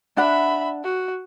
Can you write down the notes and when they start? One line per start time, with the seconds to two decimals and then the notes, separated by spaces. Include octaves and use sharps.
0.17 D4 E5 F#5 B5
0.84 F#4